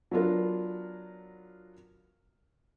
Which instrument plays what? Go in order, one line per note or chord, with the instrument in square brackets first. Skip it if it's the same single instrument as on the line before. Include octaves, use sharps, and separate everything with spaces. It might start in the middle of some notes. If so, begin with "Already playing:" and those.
[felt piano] F#3 B3 D4 F4 A#4